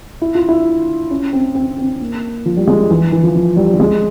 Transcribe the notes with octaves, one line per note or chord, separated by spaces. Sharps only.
E4
F4
E4
C#4
C4
C4
C4
A#3
F3
G3
G#3
E3
E3
F3
F3
G3
G3
G#3